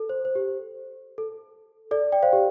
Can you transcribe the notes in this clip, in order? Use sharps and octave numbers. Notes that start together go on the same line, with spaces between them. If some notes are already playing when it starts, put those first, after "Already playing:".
Already playing: A4
C5
C5
G4
A4
A4 D5
D5 G5
C5 F5
G4